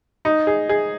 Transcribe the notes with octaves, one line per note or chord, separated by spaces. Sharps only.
D#4
G#4
G#4